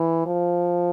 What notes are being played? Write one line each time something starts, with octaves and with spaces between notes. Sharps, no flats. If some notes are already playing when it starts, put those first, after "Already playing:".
Already playing: E3
F3